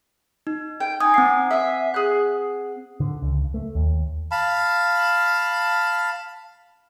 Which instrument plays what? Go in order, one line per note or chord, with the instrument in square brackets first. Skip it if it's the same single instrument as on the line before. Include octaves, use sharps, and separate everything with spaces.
[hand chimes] D#4
[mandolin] G5
[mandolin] D#4 G#5 [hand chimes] D#6
[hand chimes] C4 F#5 C7
[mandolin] E5 G#5
G#4 F#6
[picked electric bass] D3
C#2
A3
D#2
[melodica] F5 A5 B5